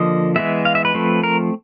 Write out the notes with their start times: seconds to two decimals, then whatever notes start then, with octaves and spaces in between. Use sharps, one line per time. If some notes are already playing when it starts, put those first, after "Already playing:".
Already playing: D3 F3 A#3 D#5
0.36 E3 G#3 B3 E5
0.65 F5
0.75 E5
0.85 B4
0.95 F3 A3 C4
1.24 A#4